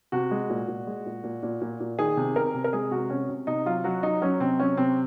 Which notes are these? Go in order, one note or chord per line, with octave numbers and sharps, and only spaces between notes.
C3 F#4
G#3
A#2
A#2
G#3
A#2
A#2
A#2
A#2
A#2
D#3 G#4
C3
C3 A#4
C3
A#4
G#3 G#4
C3 F#4
C3 C#4
C3
C3 D#4
F#3 F4
F#3 F#4
F#3 D#4
F#3 C#4
C3 C4
F#3 C#4
C3 C4